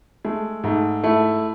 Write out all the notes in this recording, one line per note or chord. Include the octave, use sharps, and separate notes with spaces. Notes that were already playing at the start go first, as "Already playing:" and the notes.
G#3 A3
G#2 A3
A3 E4